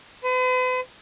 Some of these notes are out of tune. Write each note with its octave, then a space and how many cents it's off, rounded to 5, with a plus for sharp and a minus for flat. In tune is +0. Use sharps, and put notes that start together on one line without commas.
B4 +45